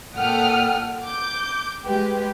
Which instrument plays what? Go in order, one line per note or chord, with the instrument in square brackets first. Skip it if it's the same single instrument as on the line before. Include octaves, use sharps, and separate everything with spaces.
[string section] A#2 A4 F#5 G5 D#6 F6
D6 G6
G#3 G4 B4